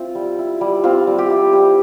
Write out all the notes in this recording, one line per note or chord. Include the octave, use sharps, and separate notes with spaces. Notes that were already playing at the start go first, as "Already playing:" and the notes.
Already playing: C4 E4 F4
G3
E4
G3
C4 F4
G3
G4
E4
G3 G4